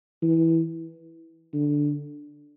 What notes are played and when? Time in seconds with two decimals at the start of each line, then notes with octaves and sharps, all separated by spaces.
0.22 E3
1.54 D3